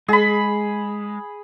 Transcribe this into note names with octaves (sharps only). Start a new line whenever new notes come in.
G#3 G#4 B5